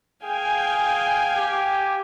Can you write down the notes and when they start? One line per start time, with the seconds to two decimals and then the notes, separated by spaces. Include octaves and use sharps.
0.24 G#4 F5 G5 G#5
1.35 G4